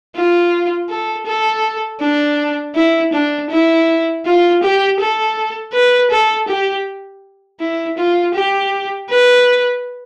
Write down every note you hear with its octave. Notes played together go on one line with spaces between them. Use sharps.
F4
A4
A4
D4
E4
D4
E4
F4
G4
A4
B4
A4
G4
E4
F4
G4
B4